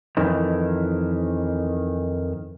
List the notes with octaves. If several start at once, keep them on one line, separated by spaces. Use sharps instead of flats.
F2 D#3 E3